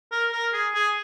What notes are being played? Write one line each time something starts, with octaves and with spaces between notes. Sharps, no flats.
A#4
A#4
G#4
G#4